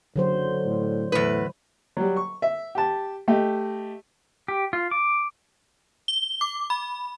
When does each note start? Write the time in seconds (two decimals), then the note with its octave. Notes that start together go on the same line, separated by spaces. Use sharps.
0.16 F#1 D3 F#3 C5
0.65 A2
1.12 E2 A2 B4
1.97 F#3 G3
2.16 C#6
2.42 E5
2.75 G4 A5
3.28 A3 G4 D#5
4.48 G4
4.73 F4
4.91 D6
6.08 G7
6.41 D6
6.70 B5